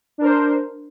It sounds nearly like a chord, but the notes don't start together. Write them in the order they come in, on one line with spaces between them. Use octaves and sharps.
D4 A#4 C5